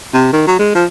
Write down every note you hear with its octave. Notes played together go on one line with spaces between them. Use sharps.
C3
D#3
F#3
G#3
F3